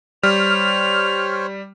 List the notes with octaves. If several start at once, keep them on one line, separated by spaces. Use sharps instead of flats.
G3 C5 C#5 F6 F7